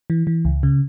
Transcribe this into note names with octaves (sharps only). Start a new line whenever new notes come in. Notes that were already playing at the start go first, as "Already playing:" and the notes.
E3
E3
C#2
C#3